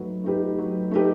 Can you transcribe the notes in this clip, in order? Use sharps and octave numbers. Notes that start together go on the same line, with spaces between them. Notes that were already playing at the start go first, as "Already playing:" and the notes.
Already playing: F#3 A3 D#4 B4
A3 D#4 G4 B4
F#3
A3 D#4 G4 B4